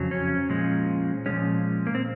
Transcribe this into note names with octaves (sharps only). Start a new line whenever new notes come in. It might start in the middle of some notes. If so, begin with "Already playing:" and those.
Already playing: F2 C#3 F#3
C#4
A#2 F3 G#3
A#2 F3 G#3 C#4
A#3
C4